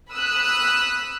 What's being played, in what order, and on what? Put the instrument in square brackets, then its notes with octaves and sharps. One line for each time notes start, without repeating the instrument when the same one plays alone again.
[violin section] B5 D#6 E6 F#6